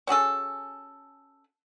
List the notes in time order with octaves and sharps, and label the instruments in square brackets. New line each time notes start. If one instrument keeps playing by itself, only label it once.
[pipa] C#4 F#4 G#4 A4